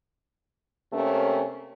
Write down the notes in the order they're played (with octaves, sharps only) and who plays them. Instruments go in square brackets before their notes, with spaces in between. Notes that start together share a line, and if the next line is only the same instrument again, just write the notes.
[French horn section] C3 A3 A#3 C#4